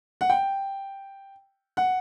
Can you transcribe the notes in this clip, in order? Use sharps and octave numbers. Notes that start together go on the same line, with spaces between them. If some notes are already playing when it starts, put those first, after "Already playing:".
F#5
G5
F#5